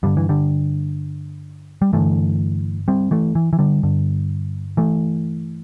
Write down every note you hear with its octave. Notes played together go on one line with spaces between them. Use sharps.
G2 D3 G3
E3
D3 G3
G3
G2 D3 E3 A3
G3 C4
E3 A3
E3
E3
D3 G3
G2 D3
E3 A3